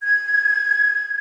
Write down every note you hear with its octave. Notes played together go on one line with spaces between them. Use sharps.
G#6